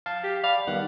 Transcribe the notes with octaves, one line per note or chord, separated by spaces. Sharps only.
F5 A5
G4
D5 F5 B5
D#3 G3 B3 F#5